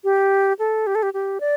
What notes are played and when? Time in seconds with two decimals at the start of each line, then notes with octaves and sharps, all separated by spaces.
0.04 G4
0.59 A4
0.87 G4
0.95 A4
1.03 G4
1.14 G4
1.40 D5